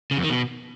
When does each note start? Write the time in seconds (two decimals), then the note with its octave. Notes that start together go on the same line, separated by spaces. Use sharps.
0.11 C#3
0.17 F2
0.24 D#3
0.30 B2